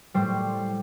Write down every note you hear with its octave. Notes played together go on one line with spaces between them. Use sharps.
A2 G3 C5